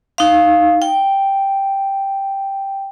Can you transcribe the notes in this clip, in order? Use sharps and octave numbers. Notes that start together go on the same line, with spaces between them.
D#4 F5
G5